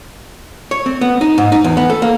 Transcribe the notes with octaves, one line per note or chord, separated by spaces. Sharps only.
C#5
C4
B3
D#4
G#2
D#4
E2
B3
A4
A#3